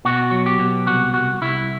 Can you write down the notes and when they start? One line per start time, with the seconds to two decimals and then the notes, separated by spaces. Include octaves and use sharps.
0.05 B2 F#4
0.31 F#3
0.46 G4
0.59 B2
0.87 C2 F#4
1.14 C2 F#4
1.41 C2 E4